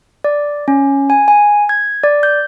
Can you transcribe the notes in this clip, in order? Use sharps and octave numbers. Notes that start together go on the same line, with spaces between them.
D5
C#4
G#5
G#5
G#6
D5
G6